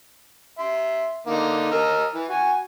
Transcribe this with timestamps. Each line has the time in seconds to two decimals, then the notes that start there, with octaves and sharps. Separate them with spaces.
0.59 E5 C6
1.26 D3 A#3 D#4
1.71 A#4 D#5 E6
2.13 E3
2.29 F#4 G#5